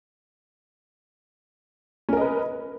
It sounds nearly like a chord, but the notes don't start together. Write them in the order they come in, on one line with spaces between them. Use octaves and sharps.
C#4 A#4 D#5 B4